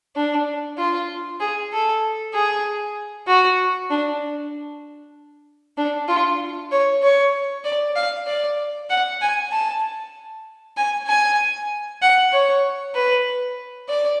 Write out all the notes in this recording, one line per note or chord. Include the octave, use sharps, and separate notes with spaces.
D4
F4
G#4
A4
G#4
F#4
D4
D4
F4
C#5
C#5
D5
F5
D5
F#5
G#5
A5
G#5
G#5
F#5
C#5
B4
D5